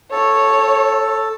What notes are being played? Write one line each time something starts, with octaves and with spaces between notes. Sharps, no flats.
A4 C#5